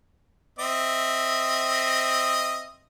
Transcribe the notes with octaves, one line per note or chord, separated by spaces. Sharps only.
C4 D#5 E5